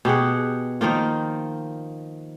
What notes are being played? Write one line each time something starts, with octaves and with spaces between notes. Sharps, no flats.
B2 G4 G#4 F#5
D#3 F3 A#3 F4